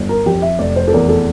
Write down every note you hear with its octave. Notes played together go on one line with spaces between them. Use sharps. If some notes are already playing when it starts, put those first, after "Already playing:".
Already playing: G1
A#4
F2 G4
E5
F1 D5
C5
A4
E2 A#4
A4